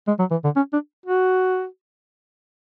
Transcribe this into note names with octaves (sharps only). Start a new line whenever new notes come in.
G#3
F#3
E3
D3
C#4
D4
F#4